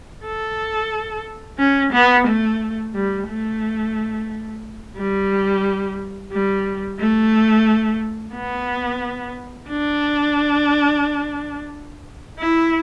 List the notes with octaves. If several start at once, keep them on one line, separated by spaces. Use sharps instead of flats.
A4
C#4
B3
A3
G3
A3
G3
G3
A3
B3
D4
E4